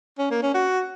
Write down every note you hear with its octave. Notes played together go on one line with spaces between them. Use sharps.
C#4
A#3
C#4
F#4